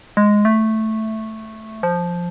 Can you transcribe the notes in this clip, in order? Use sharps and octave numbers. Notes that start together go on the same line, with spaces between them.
G#3
A3
F3